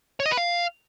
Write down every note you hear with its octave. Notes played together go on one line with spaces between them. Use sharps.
C#5
D#5
B4
F5